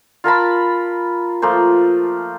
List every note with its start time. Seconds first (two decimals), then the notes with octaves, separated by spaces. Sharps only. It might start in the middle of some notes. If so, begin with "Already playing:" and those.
0.24 F4 A#4 A5 B5
1.42 F3 A3 A#3 C5